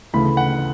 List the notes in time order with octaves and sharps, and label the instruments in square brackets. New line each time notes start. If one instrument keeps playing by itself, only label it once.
[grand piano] D2 C#3 E3 A3 B5
F#5